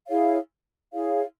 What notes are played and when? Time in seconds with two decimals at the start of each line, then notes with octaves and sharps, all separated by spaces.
0.07 E4 G#4 C#5 F5
0.93 E4 G#4 C#5 F5